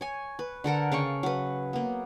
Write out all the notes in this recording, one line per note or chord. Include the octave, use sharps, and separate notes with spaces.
C#5 G#5
B4
D3 A4 A#4 F#5
C#3 F5 G5 C#6
F#3 B4
A#3 B3